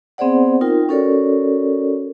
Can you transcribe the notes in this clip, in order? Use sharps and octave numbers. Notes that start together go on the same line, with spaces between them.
B3 C4 G#4 C5 D5 F#5
D#4 F4 A#4 G5
C#4 F#4 A4 A#4 C#5 D5